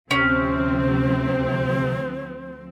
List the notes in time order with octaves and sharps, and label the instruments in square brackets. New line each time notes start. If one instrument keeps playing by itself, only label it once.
[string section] D2 F3 C4 [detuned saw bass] C3 [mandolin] C#4 [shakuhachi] C5